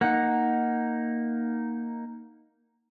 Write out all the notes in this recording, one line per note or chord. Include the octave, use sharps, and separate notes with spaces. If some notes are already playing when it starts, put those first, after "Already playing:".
A#3 D#4 F#5